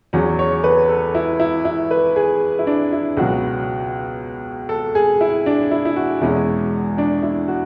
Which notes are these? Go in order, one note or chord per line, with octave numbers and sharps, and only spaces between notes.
E2 C#3 F#3 C#4
C#5
B4
A4
E4
E4
E4
B4
G#4
E4
D4
E4
C#2 B2 F#3 F#4
A4
G#4
E4
D4
E4
E4
F#4
E2 B2 G#3 C#4 E4
D4
E4
F#4